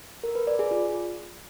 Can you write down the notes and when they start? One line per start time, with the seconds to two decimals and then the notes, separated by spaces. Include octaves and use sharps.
0.24 A#4
0.35 B4
0.47 D5
0.59 G#4
0.71 F4